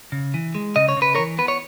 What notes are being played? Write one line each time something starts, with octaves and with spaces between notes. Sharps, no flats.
C#3
E3
G#3
C#3 D#5
C#5
C#3 B4
E3 A#4 C#5
B3 B4
C#5